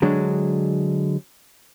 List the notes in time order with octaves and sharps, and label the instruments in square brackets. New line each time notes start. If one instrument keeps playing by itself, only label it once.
[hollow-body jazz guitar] D3 F#3 G#3 D4